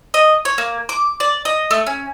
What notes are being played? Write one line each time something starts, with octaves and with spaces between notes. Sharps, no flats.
D#5
C#5
A#3
D6
D5
D#5
A3
C#4